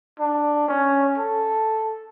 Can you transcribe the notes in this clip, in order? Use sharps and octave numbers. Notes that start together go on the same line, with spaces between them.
D4
C#4
A4